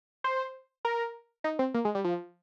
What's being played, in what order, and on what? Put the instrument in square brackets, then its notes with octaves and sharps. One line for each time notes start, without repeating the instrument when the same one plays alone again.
[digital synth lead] C5
A#4
D#4
C4
A#3
G#3
G3
F3